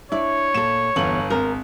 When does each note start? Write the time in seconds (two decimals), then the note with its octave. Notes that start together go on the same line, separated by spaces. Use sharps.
0.12 D4 E4 C#5 D5
0.54 A#2 A4 E7
0.96 G1 E2 F4 F#7
1.30 G#1 A#4